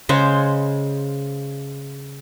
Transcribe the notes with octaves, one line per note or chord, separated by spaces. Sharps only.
C#3 G#3 C5